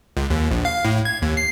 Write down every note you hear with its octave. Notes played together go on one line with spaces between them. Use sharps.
C#2
D#2
A#1
F5
A2
G#6
D#2
C7